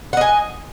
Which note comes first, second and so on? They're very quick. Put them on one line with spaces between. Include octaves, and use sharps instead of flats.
F#5 D#5 G#5